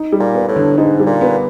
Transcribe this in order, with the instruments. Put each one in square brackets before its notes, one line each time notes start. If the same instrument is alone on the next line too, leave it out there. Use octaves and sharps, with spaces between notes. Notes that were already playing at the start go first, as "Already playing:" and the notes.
Already playing: [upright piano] D#4
G3
[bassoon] A#2
[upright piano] B3
[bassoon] A2
[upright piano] D3
[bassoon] G#2 [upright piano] D#4
[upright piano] G3
[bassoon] A#2
[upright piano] B3